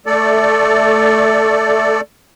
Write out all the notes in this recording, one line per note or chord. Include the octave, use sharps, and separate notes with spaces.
A3 A4 D5